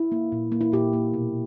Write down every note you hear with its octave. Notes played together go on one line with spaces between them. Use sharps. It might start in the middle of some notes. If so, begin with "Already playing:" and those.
Already playing: E4
A#3
A#2
A#3
E4
A#2 G4
A#3
B2